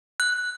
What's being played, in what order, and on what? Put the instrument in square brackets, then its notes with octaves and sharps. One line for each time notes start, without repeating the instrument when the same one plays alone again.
[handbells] F#6